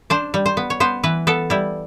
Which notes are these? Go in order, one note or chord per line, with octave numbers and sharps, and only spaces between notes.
D4 C5
G3
C5
B3
C#5
B3 C5
E3 B4
B3 A4
G3 E4